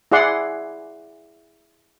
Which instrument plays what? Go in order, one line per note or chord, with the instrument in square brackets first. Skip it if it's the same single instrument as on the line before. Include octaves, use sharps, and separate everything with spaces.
[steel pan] E4 G#4 D5 F#5 C6